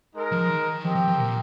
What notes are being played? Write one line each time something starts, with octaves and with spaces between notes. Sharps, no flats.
G#3 D#4 A#4
F3
D#3
F3 C4 G4 A#4 D#5 G5
F3
F3
A#2